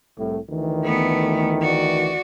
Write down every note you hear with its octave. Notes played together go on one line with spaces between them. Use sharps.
C2 A2
D2 D#3 E3
A3 B3
F#4 D5